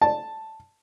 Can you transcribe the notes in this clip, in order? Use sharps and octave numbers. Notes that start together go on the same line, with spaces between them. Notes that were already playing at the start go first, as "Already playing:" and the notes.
A5